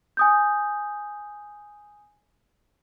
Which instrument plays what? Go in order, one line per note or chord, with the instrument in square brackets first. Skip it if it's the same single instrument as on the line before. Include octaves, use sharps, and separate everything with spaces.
[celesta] G#5 D#6 G6